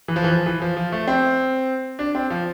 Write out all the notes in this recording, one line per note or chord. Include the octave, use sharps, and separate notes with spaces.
E3
F3
E3
F3
E3
F3
F3
A3
C4
D4
C4
F3